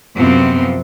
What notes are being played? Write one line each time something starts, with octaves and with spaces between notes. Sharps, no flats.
F#2 C3 F3 B3 C4